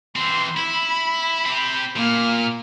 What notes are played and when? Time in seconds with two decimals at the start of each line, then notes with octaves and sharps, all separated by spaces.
0.16 E3 C4 C6
0.57 E4 B5
1.46 C4 G4
1.96 A#2 A#3 F6